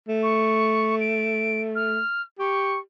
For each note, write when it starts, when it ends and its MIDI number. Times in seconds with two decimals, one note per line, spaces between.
0.09 2.00 57
0.22 0.95 85
1.00 1.61 98
1.75 2.22 89
2.39 2.79 67
2.39 2.78 85